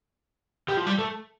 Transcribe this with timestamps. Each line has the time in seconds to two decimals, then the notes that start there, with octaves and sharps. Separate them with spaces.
0.68 G3
0.77 F3
0.86 G3
0.98 A3